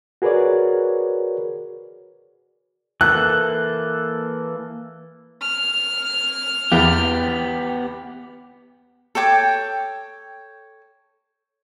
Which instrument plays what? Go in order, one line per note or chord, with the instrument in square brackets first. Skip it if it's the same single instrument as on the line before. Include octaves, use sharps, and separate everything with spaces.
[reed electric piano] F#4 G#4 A#4 B4 C#5 D5
[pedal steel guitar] E3 A#3 A4 [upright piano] F#6
[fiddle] F6
[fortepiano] E2 [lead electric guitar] B3 G4
[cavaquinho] A4 C#5 G5 D6